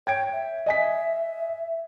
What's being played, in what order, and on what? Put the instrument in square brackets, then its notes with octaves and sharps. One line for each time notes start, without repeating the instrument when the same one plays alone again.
[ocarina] C#5 [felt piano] G5 G#6 D7
[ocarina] E5
[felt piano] D#5 G#5 B6